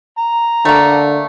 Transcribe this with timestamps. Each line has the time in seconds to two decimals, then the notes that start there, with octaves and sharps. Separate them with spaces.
0.18 A#5
0.65 D3 A3 A#3